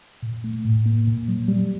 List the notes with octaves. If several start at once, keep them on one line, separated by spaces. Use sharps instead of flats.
A#2
A3
A2
A#3
A#2
F#3
G3